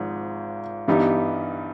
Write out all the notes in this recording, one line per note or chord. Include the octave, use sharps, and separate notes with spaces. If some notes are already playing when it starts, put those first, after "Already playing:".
Already playing: G#1 G#2 F3
G2 E3 G3 B3 D#4